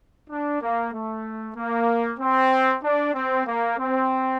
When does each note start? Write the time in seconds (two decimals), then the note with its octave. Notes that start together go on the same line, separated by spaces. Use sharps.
0.30 D4
0.62 A#3
0.93 A3
1.56 A#3
2.19 C4
2.83 D4
3.15 C4
3.47 A#3
3.78 C4